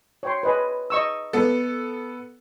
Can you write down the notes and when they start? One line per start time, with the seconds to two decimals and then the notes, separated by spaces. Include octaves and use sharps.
0.23 C#5 G5 C6
0.43 B4 D#5 G#5
0.90 D#5 C#6 E6
1.33 B3 A4